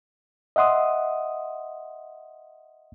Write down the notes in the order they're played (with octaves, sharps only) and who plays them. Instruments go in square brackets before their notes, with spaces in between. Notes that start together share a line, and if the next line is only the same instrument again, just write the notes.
[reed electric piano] D#5 E5 F#5 C6 D#6